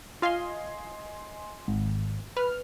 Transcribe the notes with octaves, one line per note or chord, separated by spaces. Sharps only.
F4 D#5 F5 G#5 C6
G#1
B4 F6